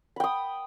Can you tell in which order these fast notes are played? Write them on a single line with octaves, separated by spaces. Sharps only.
B5 G5 D#6